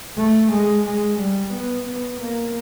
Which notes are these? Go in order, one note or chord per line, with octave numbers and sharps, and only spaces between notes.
A3
G#3
G#3
G3
B3
B3
A#3